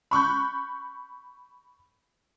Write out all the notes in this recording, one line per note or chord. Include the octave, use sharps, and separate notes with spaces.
B5 C#6 F#6 G6